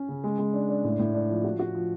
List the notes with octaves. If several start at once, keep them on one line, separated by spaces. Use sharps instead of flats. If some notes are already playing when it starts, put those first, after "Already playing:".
Already playing: C#4
C#3
G#3
G#3
D4
D4
A2
A2
D4
F3
F#4
F#4
F3